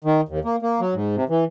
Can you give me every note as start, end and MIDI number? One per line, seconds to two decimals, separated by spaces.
0.04 0.21 51
0.29 0.40 39
0.45 0.56 58
0.62 0.80 58
0.80 0.94 54
0.94 1.15 44
1.16 1.24 48
1.29 1.44 52